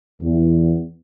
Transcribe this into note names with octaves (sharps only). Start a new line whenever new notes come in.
E2